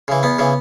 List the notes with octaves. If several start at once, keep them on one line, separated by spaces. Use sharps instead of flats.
C#3 E3
E2 B3
C#3 E3